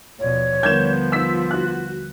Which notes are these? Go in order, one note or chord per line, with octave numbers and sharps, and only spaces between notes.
D#2 B2 F3 C#5 D5
D3 F3 G3 B3 A#4 G6 G#6 E7
F4 E6 B6
F#4 F#6